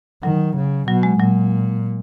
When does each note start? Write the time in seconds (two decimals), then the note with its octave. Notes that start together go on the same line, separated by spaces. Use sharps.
0.23 D#3 F#3
0.56 C#3
0.88 B2 F#3
1.03 G#3
1.19 A#2 F#3